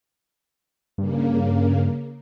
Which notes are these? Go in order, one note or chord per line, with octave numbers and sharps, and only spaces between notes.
G2 C#3 A#3